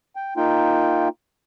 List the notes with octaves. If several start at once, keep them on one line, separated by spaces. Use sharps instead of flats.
G5
A#3 D#4 F4 G5